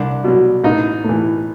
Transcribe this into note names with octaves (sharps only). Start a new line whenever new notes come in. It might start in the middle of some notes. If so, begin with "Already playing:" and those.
Already playing: C2 D4
B2 F#3
A1 D#4
A2 E3